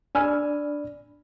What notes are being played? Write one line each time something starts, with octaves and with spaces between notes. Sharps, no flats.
D4 D5 G#5 B5 E6 F6